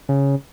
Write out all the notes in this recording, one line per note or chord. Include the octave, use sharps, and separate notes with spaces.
C#3